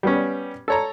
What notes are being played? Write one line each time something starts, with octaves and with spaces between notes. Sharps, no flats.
G3 B3 C#4
A4 C#5 A#5